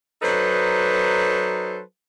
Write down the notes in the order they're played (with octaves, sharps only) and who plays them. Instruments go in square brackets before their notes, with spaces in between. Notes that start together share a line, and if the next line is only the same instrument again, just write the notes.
[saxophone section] F#3 D#4 A4 B4 C5